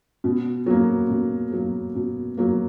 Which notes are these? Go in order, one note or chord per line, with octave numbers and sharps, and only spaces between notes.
B2
F#3 A#3
B2
F#3 A#3
B2
F#3 A#3